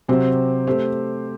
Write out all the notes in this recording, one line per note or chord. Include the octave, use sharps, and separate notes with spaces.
C3 F#3 C4 G4 C5
A3 C4 G4 C5